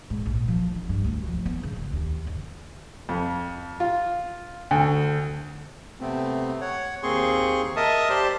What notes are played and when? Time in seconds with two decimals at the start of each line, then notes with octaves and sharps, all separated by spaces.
0.10 G#2
0.26 A#1
0.48 F3
0.75 D#4
0.89 G2
1.04 D2
1.27 F3
1.46 B3
1.63 C#3
1.76 F#1
1.93 D#2
2.27 D3
3.09 F2
3.80 F4
4.71 D2
6.01 C3 A3 B3 C4
6.61 C#5 F#5
7.03 D#2 A#3 C4 G#4 C6 C#6
7.76 A#4 D#5 E5 A5 D#6
8.10 G4 C5 D5 A5 C6